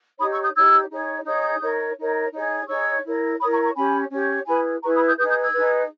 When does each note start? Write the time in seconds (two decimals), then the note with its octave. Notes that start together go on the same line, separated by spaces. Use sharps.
0.18 D#4 G4 C#5 B5 D#6
0.31 C#6 E6
0.42 D#6 G6
0.54 D#4 G4 C#5 E6 G#6
0.90 D#4 G#4 C#5
1.26 D#4 G#4 C#5 D#6 G6
1.61 D#4 A#4 C#5
1.97 D#4 A#4 C#5
2.32 D#4 G#4 C#5
2.68 D#4 G#4 C#5 C#6 E6
3.04 E4 A#4 C#5
3.39 E4 A#4 C#5 B5 D#6
3.51 A#5 C#6
3.63 A#5 C#6
3.75 C#4 G4 C#5 G#5 B5
4.10 C#4 G4 C#5
4.46 E4 G#4 B4 G#5 B5
4.82 E4 G#4 B4 A#5 C#6
4.94 B5 D#6
5.06 D#6 G6
5.18 D#4 G#4 B4 D#6 G6
5.29 D#6 G6
5.41 E6 G#6
5.54 D#4 G#4 B4